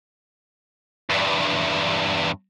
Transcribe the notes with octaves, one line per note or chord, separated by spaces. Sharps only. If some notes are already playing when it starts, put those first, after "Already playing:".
E2 G2